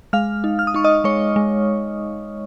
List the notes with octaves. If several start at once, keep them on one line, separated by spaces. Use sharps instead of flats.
G#3 F5 F6
D#4
F6
D#6
D#4 C#6
D#5 D#6
G#3 C#5 C#6
G#3